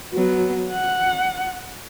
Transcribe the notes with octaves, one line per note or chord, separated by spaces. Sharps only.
F#3 B3
F#5